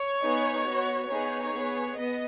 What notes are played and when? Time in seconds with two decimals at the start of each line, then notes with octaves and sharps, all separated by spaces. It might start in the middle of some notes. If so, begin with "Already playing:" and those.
Already playing: C#5
0.23 B3 D#4 G#4
0.66 B3 F#4
1.09 B3 D#4 G#4 C#5
1.52 B3 G#4
1.96 B3 D#5